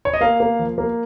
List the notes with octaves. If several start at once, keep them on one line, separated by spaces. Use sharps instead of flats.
C#5
D#5
A#3 F5
A#3
F3
A#3